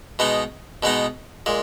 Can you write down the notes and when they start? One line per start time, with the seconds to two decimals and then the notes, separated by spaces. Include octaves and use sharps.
0.19 B2 G#3 B3 D#4
0.83 B2 G#3 B3 D#4
1.46 A#2 G#3